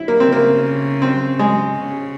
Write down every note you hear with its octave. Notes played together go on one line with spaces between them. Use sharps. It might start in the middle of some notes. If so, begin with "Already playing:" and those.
Already playing: E4
A#3
C4
C#3
A#3
C4
G#3
C#3